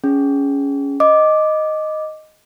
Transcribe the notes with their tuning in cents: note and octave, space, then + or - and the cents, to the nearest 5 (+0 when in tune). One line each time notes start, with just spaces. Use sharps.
C#4 +10 G#4 +0
D#5 +0 D6 +0